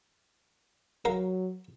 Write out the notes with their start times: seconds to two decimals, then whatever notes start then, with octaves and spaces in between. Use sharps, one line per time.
1.05 F#3 A#4 F5